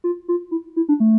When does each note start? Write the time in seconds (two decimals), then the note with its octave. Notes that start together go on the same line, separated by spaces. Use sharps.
0.04 F4
0.28 F4
0.51 E4
0.76 E4
0.89 D4
1.00 A3